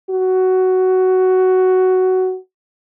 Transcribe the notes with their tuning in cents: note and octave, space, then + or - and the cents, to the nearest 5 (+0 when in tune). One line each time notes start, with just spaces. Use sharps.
F#4 +10